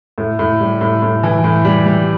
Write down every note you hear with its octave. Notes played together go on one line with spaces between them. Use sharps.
A2
A2
G3
A2
A2
E3
A2
G3
G3